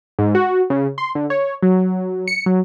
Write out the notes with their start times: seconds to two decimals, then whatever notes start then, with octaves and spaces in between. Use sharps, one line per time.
0.19 G#2
0.35 F#4
0.70 C#3
0.98 C6
1.15 D3
1.30 C#5
1.63 F#3
2.28 C#7
2.46 F#3